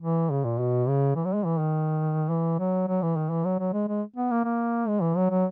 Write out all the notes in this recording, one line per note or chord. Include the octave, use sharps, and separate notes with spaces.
E3
C#3
A#2
B2
C#3
E3
F#3
G#3
E3
D#3
E3
F#3
F#3
E3
D#3
E3
F#3
F#3
G#3
G#3
B3
A#3
A#3
G#3
E3
F#3
F#3